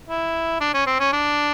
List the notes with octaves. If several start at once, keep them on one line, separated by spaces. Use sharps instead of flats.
E4
D4
C#4
C4
C#4
D4